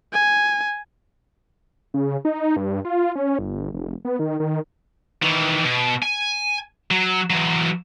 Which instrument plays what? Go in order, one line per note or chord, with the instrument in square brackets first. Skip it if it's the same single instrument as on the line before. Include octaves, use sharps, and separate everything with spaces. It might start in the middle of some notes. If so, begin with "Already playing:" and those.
[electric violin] G#5
[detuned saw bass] C#3
D#4
G2
F4
C#4
G1
F1
B3
D#3
D#3
[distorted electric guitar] D#3 E3
B2
G#5
F#3
E3 F#3